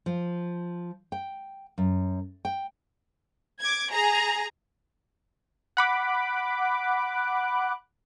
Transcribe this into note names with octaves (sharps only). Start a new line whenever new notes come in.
F3
G5
F#2
G5
D6 G#6
G#4 A#5
F#5 B5 D6 F#6